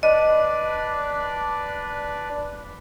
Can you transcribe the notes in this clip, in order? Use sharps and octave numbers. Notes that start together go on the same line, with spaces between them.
D4 B4 D5 D#5